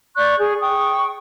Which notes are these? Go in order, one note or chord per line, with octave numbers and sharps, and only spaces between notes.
D5 C#6 F#6 G6
G#4
G5 C#6 D#6